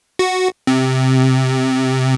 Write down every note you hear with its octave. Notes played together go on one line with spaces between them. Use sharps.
F#4
C3